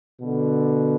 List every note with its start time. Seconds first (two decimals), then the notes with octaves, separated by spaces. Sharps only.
0.21 B2 D3